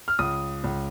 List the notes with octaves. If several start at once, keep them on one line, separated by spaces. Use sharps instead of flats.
F6
C#2 D#6
C#2